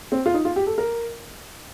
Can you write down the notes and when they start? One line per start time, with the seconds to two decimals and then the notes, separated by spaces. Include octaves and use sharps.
0.12 C4
0.26 F4
0.34 D#4
0.45 F4
0.56 G4
0.67 A4
0.78 A#4